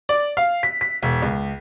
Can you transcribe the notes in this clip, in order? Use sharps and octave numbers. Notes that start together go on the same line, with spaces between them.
D5
F5
B6
B6
E1
C#2